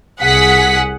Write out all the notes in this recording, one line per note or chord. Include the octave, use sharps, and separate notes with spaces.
C2 G#4 F#5 B6